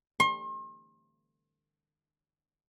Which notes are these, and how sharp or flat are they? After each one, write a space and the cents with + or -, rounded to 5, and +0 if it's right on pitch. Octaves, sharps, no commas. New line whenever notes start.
C6 +40